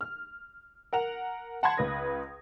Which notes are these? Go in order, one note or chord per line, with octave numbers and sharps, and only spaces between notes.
F6
A#4 F#5 F7
F#5 A5 B5 C6 G#6
C#2 B4 D#6 A#6